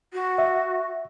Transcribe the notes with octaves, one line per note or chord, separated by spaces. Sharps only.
F#4
E5